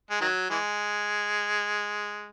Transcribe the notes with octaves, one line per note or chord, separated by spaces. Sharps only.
G#3
D#3 F#3
E3 G#3